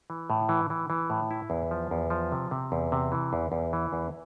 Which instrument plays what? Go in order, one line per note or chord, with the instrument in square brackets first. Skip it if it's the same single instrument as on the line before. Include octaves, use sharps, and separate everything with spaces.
[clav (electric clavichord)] E3
A2
E3
E3
E3
A2
E4
E2
F3
E2
F3
C3
C3
E2
C3
E3
E2
E2
E3
E2